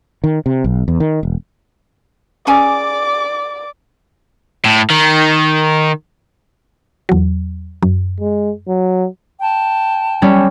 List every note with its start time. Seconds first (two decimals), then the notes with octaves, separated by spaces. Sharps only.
0.24 D#3
0.46 C3
0.64 B1
0.88 E2
1.00 D#3
1.23 E1
2.47 C#4 G#4 D5 G#5 D6
4.65 A2
4.90 D#3
7.09 E2 F#3
7.83 F#2
8.20 G#3
8.68 F#3
9.41 G5 A5
10.22 G3 C#4